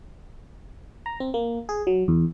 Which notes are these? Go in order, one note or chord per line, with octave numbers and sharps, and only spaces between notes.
A#5
C4
A#3
G#4
F#3
E2